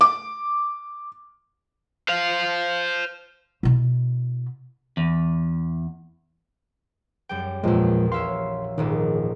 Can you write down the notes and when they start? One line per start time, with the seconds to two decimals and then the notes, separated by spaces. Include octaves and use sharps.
0.01 D6
2.08 C5 F5
3.63 B2 E4
4.97 E2
7.29 F#2 G3 G5
7.63 A#1 E2 A#2 F3 G#3
8.12 C#5 E5 F5 C6
8.78 D#1 A#1 G#2 D#3